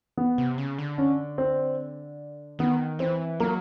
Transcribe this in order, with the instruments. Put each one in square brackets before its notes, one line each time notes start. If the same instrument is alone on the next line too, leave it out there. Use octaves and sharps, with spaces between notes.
[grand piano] B3
[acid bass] C3
C#3
D3
[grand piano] C#4
C4
[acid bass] D#3 [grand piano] B3
[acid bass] E3 [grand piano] C4
[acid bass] F#3 [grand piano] A#3